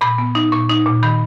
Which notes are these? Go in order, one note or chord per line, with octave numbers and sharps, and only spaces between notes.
A#2 B5
B3
D#4
A#2 C#6
D#4
A#2
D#3 B5